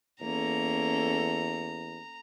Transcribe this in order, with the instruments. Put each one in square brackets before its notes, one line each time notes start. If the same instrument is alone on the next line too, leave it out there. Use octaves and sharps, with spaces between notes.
[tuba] E2 [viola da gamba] A#3 C#4 A4 [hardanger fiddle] A#5